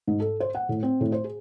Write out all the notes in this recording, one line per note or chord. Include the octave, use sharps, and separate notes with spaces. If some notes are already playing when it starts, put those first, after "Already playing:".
G#2
A4
C5
F#5
A2
C4
A2
C5
G#4